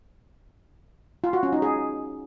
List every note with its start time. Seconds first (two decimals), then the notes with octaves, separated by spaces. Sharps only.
1.24 F4
1.33 F#4
1.43 C#4
1.53 D#4
1.62 G#4